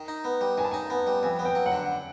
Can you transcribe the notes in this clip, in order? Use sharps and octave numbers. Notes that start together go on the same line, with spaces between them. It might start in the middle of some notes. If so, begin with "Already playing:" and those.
Already playing: D#3
D#4
B3
G3
D#3 G#5
A5
D#4 G#5
B3 G#5
G3
F2 G#5
B3
G5
F#3
F#5
D3